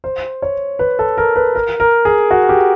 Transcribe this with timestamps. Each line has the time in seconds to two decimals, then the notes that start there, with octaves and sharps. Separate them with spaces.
0.04 C5
0.42 C#5
0.79 B4
0.99 A4
1.17 A#4
1.36 B4
1.55 A#4
1.80 A#4
2.05 G#4
2.31 F#4
2.49 G4